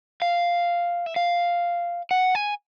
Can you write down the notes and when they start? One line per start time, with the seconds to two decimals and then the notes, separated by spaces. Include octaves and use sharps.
0.22 F5
1.06 E5
1.16 F5
2.11 F#5
2.35 G#5